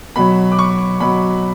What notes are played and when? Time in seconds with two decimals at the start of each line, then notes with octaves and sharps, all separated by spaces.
0.16 B2 F#3 B5
0.52 D6
0.59 C#6
1.00 B2 F#3 B5